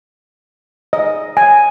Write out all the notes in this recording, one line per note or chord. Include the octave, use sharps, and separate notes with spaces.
D#5
G#5